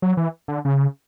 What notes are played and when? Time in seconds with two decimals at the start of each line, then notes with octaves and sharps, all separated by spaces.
0.02 F#3
0.17 E3
0.48 D3
0.65 C#3